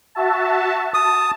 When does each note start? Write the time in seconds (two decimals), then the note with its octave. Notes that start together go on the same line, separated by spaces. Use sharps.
0.15 F#4 E5 A5
0.94 A5 D#6